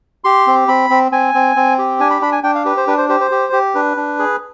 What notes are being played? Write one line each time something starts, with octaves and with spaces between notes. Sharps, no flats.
G4 C6
C4
C4 B5
C4
C4 G#5
C4
C4
G4
D4 G#5
B5
D4 B5
G#5
D4 G5
F5
G4 B4
C5
D4 B4
C5
G4 C5
C5
G4
G4
D4 B4
D4
G#4